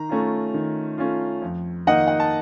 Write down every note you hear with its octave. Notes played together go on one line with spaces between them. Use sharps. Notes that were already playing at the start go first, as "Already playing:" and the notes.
Already playing: D#3 A#5
A3 C#4 F4
D#3
A3 C#4 F4
F2
D#3 A#3 D#4 D#5 F#5
F#5
A5